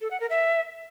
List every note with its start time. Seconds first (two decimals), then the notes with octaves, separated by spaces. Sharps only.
0.01 A4
0.11 F#5
0.20 A#4
0.30 E5